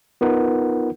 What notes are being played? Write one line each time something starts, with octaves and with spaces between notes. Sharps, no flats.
B3 D#4 F4 A#4 B4 F#5